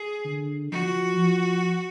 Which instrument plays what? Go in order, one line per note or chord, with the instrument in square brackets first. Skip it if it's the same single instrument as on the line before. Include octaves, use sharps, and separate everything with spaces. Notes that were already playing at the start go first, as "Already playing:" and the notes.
Already playing: [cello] G#4
[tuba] D3
[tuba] F3 [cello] F#4
[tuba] F3